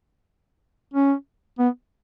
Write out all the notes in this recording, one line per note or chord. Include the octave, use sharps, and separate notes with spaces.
C#4
B3